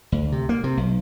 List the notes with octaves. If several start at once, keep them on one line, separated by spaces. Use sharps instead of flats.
D2
C3
A#3
C3
B1